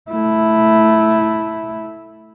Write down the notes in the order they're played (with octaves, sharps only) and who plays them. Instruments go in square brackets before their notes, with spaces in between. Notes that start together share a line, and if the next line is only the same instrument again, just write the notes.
[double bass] A3 E4